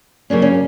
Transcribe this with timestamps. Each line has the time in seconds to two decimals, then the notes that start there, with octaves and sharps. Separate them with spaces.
0.30 C#3 F#3 A#3 C#4 D4
0.42 C#4